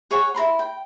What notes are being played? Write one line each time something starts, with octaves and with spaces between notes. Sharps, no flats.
G#4 C#5 F#5 C#6
E4 A#4 B5 C6
G5